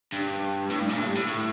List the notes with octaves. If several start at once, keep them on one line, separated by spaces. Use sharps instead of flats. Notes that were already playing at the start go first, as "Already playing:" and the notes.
G2
A2
G2
A#2
A2
G2
A2
A2